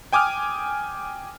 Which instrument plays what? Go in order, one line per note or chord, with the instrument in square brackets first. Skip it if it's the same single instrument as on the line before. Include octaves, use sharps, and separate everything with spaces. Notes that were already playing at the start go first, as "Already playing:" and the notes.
[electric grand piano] G5 G#5 D6 D#6 F6